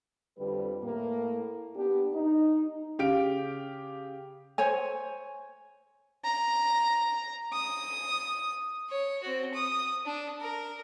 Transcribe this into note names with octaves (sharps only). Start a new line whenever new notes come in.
F2 D3 G3 B4
A2 A#3
B3 D4 G4
D#4
C#3 G4 F5 D7
C5 C#5 G#5
A#5
D#6
C#5
C4 F#4
D#6
D4
A#4